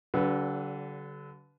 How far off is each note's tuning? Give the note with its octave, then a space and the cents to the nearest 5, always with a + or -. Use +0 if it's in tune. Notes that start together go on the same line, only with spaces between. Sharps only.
D3 -30 F#3 +45 B4 +0